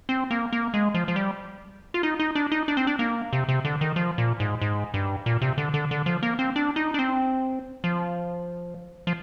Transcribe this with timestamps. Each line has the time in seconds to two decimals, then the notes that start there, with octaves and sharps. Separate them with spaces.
0.09 C4
0.31 A#3
0.53 A#3
0.74 G#3
0.94 F3
1.08 F3
1.16 G3
1.94 F4
2.03 D#4
2.20 D#4
2.35 D4
2.52 D#4
2.68 D4
2.77 C4
2.87 D4
2.99 A#3
3.33 C3
3.48 C3
3.65 D3
3.81 D#3
3.96 F3
4.18 A#2
4.40 G#2
4.61 G#2
4.94 G2
5.26 A#2
5.41 C3
5.58 D3
5.74 D3
5.91 D3
6.06 F3
6.23 A#3
6.39 C4
6.56 D4
6.76 D#4
6.94 D4
6.99 C4
7.84 F3
9.07 F3